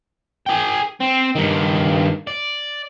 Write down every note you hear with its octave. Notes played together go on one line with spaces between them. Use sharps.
G#4 G5
C4
G2 D#3
D5